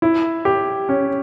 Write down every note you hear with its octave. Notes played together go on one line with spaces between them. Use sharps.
E4
G4
C#4